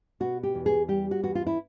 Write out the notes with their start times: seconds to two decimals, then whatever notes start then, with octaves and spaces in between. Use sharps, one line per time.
0.20 B2 F#4
0.43 G4
0.55 E2
0.66 G#4
0.88 G3 G4
1.11 F#4
1.23 E2 F#4
1.35 F4
1.46 E4